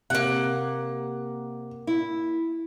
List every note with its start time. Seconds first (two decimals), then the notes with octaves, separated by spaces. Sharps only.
0.10 C3 A#3 G4 E5 F#5
1.87 E4